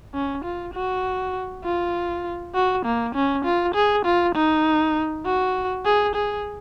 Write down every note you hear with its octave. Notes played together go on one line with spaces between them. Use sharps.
C#4
F4
F#4
F4
F#4
A#3
C#4
F4
G#4
F4
D#4
F#4
G#4
G#4